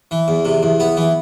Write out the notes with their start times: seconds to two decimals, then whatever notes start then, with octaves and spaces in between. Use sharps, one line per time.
0.11 E3
0.28 E2
0.45 C3
0.63 E2
0.80 B3
0.97 E3